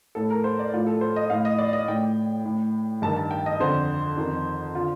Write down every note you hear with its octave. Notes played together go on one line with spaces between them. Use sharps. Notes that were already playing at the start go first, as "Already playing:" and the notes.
A2 A4
A#4
C5
D5
A2 F4
A4
C5
D#5
A2 F5
D#5
D5
D#5
A2 G5
A2
G2 D#3 A5
A5
G5
D#5
F2 D3 C5
F2 D#3
D3 F4